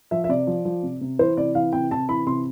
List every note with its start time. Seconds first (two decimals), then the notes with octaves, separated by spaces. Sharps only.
0.11 F3 E5
0.24 E5
0.29 C3 D5
0.47 F3
0.65 F3
0.83 C3
1.01 C3
1.19 E3 C5
1.37 C3 D5
1.55 E3 F5
1.73 C3 G5
1.91 C3 A5
2.09 E3 B5
2.27 C3 C6